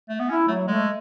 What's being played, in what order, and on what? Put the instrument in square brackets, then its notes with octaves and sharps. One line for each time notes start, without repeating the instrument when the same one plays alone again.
[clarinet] A3
B3
[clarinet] C#4 [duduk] E4
[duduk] F#3 [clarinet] A3
[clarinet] G#3 [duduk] A3